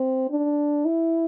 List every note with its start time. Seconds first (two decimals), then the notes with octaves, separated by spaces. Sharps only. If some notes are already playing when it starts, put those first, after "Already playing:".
Already playing: C4
0.30 D4
0.85 E4